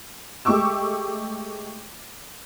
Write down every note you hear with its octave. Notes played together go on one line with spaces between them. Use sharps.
G#3 A3 G4 C#6 D6 E6